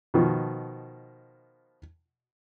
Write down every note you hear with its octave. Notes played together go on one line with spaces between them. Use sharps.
B2 D#3 F3